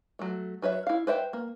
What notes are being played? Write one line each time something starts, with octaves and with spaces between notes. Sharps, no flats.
F#3 A3
F#3 B4 C#5 E5
E4 F5
B4 C5 E5 G5
A#3